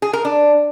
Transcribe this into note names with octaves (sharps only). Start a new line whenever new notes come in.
G#4
A#4
D4